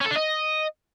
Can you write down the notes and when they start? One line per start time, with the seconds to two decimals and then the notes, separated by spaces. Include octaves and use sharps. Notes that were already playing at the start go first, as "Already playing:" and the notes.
0.01 C#4
0.06 A4
0.11 D4
0.16 D#5